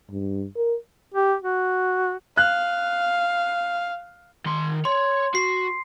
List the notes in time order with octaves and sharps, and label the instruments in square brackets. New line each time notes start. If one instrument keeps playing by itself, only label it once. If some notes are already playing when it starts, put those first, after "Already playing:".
[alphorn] G2
A#4
[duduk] G4
F#4
[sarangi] F5 [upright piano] F#6
[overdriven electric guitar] D#3 C6
[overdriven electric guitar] C#5 [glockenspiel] C6
[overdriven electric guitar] F#4 [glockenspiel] C7